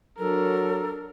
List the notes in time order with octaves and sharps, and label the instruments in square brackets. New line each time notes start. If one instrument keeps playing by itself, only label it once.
[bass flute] F#3 [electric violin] D4 A#4 [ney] A4